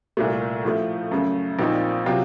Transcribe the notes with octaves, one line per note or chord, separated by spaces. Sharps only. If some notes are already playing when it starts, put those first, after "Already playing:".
C2 A#2 A3
A2 F3 A3
F#2 C#3 A3
A#1 A#2 F3 C4 D#4
C3 F#3 C4 F4